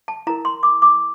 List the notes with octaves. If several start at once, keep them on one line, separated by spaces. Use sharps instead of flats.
A5
E4 A#4 A#5
C6
D6
D6